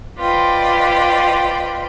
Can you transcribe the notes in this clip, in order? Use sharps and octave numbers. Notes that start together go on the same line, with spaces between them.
F4 B4 C5 D5 D#5 G5